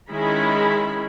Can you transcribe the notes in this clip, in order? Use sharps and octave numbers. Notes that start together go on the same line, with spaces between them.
D#3 G#3 C#4 E4 G#4 B5